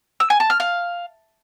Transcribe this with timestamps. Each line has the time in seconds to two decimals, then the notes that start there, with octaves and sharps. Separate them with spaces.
0.20 E6
0.30 G#5
0.40 A5
0.50 F6
0.60 F5